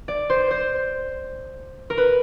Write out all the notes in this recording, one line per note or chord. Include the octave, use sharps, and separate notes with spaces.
D5
C5
C5
A#4
B4